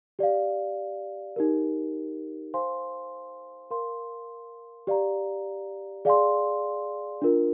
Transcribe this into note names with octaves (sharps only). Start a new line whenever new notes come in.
G4 D5 F5
D#4 G4 A#4
C5 F5 G#5 C6
A#4 F5 C6
G4 D5 F5 A#5
G#4 D5 F5 G#5 C6
D4 F4 A#4